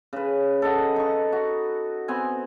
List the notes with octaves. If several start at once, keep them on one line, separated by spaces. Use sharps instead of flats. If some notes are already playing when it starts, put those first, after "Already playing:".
C#3 B4
A4 D#5 F#5
D#4 C#6
F#4
B3 C4 G#5